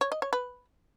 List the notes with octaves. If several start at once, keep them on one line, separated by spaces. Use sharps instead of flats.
C#5
D#5
C#5
B4